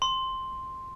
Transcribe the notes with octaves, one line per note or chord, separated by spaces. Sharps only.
C6